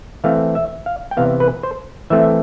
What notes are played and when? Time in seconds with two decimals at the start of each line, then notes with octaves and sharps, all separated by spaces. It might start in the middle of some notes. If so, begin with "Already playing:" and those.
0.24 E3 A3 C4 F5
0.55 E5
0.86 F5
1.11 G5
1.17 C3 E3 B3 F5
1.40 B4
1.63 C5
2.10 E3 A3 C4 E5